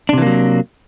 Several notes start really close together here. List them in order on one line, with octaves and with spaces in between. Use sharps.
D4 C3 E3 A#3 F#3